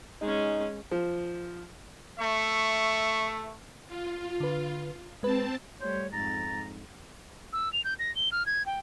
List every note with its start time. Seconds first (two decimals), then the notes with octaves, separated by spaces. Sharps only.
0.21 G#3 C#4 D#4
0.91 F3
2.19 A3 E5 C#6
3.87 F4
4.40 D3 B4
5.23 G#3 C4 B4 A5
5.81 G3 A3 C5 C#5
6.13 F2 G#2 A#5 A6
7.53 E6
7.73 F7
7.84 G6
7.99 A#6
8.16 G7
8.32 F6
8.46 G#6
8.66 G5